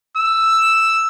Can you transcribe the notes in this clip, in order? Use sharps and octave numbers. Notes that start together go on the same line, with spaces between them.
E6